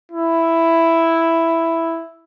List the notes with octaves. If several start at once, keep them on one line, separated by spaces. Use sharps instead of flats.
E4